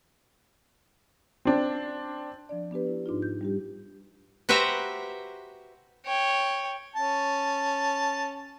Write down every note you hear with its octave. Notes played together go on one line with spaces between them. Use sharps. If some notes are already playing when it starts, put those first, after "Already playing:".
C4 D4
F3 D4 D5
B3 D4 G4 B4
E4
G#2 D4 D#4 F4
G6
G3 D4 G4
F#4 G4 B4 C5 E5 A#5
C#5 G5
C#4 A5